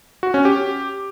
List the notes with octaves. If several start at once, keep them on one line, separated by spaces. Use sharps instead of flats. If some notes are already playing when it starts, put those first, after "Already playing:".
F#4
C#4
G4